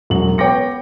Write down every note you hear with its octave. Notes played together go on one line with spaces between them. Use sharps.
E1 A1 F#3 F#7
B3 C#5 G5 D6 A#6 C#7